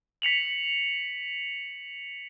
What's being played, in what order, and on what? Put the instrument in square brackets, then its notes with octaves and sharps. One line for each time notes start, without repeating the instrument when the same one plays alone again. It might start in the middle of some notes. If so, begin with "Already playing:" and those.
[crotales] B6 C#7 F7 F#7